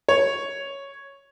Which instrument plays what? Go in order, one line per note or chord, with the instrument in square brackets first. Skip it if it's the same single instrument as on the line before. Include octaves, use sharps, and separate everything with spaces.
[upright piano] C#5